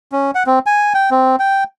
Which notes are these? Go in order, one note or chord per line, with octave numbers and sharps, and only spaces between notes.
C#4
F#5
C4
G#5
G5
C4
G5